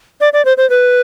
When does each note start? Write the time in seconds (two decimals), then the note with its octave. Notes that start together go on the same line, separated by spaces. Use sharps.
0.21 D5
0.33 D5
0.45 C5
0.57 C5
0.70 B4